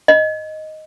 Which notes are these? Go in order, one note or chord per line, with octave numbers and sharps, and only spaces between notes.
D#5